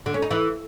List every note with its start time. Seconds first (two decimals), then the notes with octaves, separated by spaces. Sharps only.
0.06 D3
0.14 C#4
0.22 D#4
0.31 E3